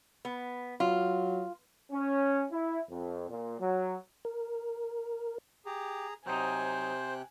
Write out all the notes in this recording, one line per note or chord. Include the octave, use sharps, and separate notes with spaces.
B3
F#3 F4
C#4
E4
F2
A#2
F#3
A#4
G4 G#4 A#5
C3 F#3 D#4 C5 G5 G#5 F#6